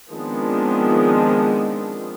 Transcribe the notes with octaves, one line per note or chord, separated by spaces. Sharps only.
D#3 F3 G#3 B3 C4 D4